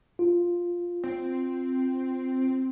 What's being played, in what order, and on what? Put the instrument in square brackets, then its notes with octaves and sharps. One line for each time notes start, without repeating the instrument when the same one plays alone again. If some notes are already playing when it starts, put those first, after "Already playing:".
[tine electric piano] F4
[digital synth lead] C4